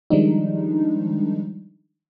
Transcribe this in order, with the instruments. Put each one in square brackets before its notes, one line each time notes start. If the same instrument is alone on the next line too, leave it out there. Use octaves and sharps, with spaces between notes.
[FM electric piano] D#3 F3 G3 G#3 D4 D#4